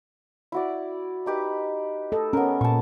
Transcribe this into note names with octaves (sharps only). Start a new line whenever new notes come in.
E4 F#4 D5
D#4 G4 B4
A4 D#5
B3 C#4 A#4
A#2 A5 C#6